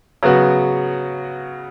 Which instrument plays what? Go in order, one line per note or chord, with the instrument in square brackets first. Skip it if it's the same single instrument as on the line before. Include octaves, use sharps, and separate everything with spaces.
[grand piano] C#3 F#3 B3 F#4